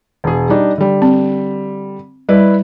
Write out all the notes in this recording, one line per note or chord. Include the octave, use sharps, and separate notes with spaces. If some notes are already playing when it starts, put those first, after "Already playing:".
E1 G#4
G3 D4 D#4
D3 G3
C4
G3 E4 B4 D5